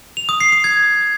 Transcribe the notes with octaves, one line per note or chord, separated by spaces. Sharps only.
F7
D#6
C7
D#6
G#6